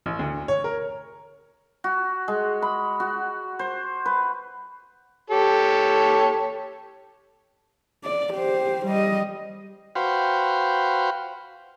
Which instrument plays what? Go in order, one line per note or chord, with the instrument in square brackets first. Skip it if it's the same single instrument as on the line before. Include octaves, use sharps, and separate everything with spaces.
[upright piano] A1
D2
C#5
A#4
[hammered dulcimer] F#4
G#3
B5
F#4
C5
B4
[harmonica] G4 A4 C#5
[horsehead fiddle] D5
G4 C5
G3 D#5
[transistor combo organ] F#4 B4 C5 F5 G5